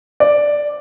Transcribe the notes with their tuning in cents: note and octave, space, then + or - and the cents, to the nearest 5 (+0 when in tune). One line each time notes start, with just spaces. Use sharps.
D5 +0